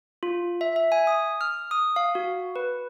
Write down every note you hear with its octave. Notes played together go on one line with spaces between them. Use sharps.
F4
E5
E5
G#5
D#6
F6
D#6
F5
F#4
B4